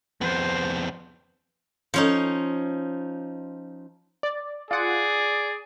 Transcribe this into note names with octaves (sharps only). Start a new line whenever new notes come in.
F2 B3 C5
F3 C#4 D#4
D5
F4 G#4 D5 F#5